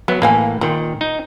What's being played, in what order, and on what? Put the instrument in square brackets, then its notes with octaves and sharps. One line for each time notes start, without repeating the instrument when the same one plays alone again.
[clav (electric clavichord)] F#3 B3 [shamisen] E5
[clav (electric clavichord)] A2 E3 A#3 [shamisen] A#4 F5 G#5
[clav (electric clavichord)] A#2 D#3 [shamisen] C4
[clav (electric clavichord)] D#4